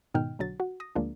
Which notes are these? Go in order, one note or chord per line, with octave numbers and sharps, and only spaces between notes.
G#2 B2 D#3 D#4 G5 F6
B1 D3 F#3 A6
F#4
D#6 A#6
D2 F3 G#3 A#3 D4